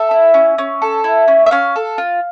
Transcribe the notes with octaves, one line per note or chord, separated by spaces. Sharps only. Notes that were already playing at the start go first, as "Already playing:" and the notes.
Already playing: A4 E5
E4
C#4
C#4
A4
E4
C#4
E5
C#4 F5
A4
F4